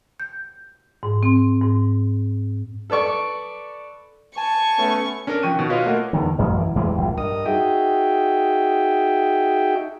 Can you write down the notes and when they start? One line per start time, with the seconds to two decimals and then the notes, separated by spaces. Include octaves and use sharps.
0.20 G6
1.03 G#2
1.23 C4
1.62 G#2
2.90 A4 B4 D5 C#6
4.37 G#5 A5 C#6
4.78 A3 B3 C#4
5.27 C#4 D4 A4 A#4
5.43 F3 G5 C#6 F#6 D#7
5.56 B2 D#3
5.70 F4 F#4 B4 C#5 D#5 F5
5.86 A3 A#3 A#4 F#5
6.13 E2 D3 D#3
6.38 A1 F#2 F3
6.59 E3
6.75 E2 E3 G3 G#3
6.98 A#1 A2
7.18 G2 A#4 D#5 D#6
7.46 D#4 F#4 G#4 E5 G5